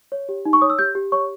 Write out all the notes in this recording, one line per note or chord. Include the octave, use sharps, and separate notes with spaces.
C#5
G4
D#4
C#6
C#5 D#6
E6
G4 G6
G4
C#5 C#6